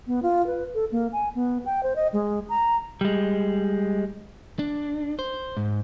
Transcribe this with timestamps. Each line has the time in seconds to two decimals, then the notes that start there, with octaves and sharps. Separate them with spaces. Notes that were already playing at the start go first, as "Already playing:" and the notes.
0.07 B3
0.23 F4
0.47 B4
0.75 A4
0.92 A#3
1.13 G#5
1.35 B3
1.65 G5
1.83 C5
1.96 D#5
2.13 G#3
2.49 A#5
3.01 G3 G#3
4.59 D4
5.19 C5
5.57 G#2